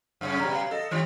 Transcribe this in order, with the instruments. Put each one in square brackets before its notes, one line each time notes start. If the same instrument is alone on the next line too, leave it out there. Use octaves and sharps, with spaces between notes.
[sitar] F#2 C#3 C#4
[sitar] B2 G3 [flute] A#5
[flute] F5
[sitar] A4 [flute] D#5
[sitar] G2 D#3 G3